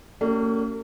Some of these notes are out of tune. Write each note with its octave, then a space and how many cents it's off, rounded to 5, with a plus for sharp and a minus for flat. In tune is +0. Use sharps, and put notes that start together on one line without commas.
A#3 -40 C#4 +25 G4 -45